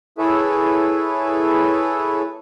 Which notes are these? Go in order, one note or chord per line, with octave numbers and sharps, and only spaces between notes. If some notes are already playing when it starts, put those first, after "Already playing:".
E4 G#4 A4 B4 C#5 E5